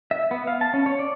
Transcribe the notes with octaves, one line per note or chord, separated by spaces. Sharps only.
E5
B3
F5
A5
C#4
C#5
D5